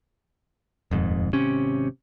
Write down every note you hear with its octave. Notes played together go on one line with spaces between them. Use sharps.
D#1 F2 G#2
G#1 C3 C#4